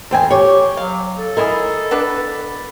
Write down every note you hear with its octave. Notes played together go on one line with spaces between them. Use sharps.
E2 A4 C5 G5 G#5
G4 C#5
F#3 F5
A4
G#3 E4 G#4 A#4
B3 D4 B4